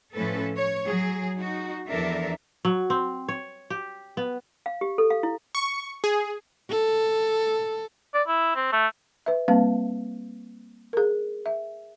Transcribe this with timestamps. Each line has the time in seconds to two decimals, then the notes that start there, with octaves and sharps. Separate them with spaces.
0.14 A2 F3 C#4 A4 B4
0.57 C#5
0.86 F#3 G#4
1.36 D#4 F#4
1.89 E2 F3 D4 A4 A#4 E5
2.65 F#3
2.90 C4
3.29 C#5
3.70 G4
4.17 B3
4.66 F5
4.81 G4
4.98 A4
5.10 F5
5.23 E4
5.55 C#6
6.04 G#4
6.70 A4
8.14 D5
8.28 E4
8.56 C4
8.72 A3
9.26 B4 E5
9.48 G3 A#3 C4 B4 F5
10.93 G#4 A#4
11.46 E5